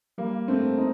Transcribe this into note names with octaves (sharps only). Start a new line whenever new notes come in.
G3 A#3
A3 C4
C4 D#4